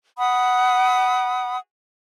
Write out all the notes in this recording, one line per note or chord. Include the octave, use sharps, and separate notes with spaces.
F#5 B5 D#6